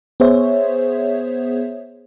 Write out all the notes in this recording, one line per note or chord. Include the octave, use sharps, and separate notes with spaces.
B3 G#4 C5 C#5 E5